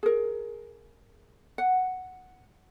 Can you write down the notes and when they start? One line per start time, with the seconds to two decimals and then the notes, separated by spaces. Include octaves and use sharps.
0.03 G#4 A#4
1.58 F#5